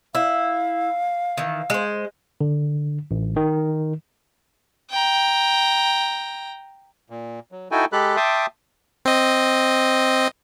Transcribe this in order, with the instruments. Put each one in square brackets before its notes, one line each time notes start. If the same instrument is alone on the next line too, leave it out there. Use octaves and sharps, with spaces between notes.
[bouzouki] E4 [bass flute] F5
[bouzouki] D#3 E3
G#3 C5
[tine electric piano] D3
A1
D#3
[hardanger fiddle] G5 A#5
[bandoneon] A#2
F#3
D#4 E4 F#4 A4 G5 G#5
G#3 G4 A4 B5 F#6
E5 G5 A5 C6 D6 D#6
[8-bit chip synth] C4 D#5